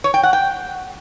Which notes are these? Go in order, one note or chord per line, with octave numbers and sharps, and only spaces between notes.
C#5
G5
F#5
G5